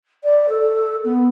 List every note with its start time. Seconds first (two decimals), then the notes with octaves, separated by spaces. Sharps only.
0.23 D5
0.49 A4
1.04 B3